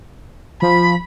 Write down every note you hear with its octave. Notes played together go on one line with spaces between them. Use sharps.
F3 B5